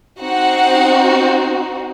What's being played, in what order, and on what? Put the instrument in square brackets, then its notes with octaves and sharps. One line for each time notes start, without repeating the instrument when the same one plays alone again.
[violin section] C4 D#4 F#4 F#5